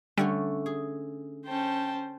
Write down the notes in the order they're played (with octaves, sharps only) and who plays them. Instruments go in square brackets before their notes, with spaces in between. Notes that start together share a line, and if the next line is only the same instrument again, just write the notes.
[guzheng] D3 A3 C#4 [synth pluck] G3
[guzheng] G#4
[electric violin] C#4 C5 [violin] G5 A5